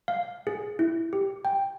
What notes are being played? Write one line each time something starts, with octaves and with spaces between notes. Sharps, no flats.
F5
G#4
E4
G4
G5